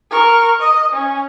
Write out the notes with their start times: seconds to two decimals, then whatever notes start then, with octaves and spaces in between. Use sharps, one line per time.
0.11 A#4 C#6
0.61 D#5
0.93 C#4